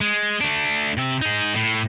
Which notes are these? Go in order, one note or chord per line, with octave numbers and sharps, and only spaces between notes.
G#3
A3 D4
C3 E5
D#4 G#4
A2